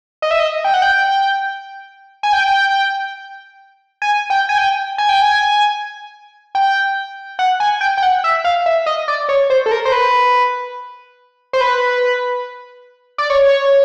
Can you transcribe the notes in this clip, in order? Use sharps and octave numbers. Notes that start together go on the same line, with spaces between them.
D#5
E5
D#5
G5
F#5
G5
G#5
G5
G#5
G5
G#5
G5
G#5
G5
G#5
G5
F#5
G#5
G5
G5
F#5
E5
F5
E5
D#5
D5
C#5
C5
A4
A#4
C5
B4
C5
B4
D5
C#5